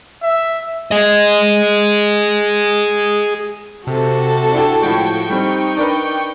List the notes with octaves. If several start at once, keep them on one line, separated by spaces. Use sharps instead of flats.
E5
G#4 D#5
C3 F#4 A4
D4 E4 G5
A2 F3 G#3 G5 C#6
G3 C4 D#4
D4 A#4 B4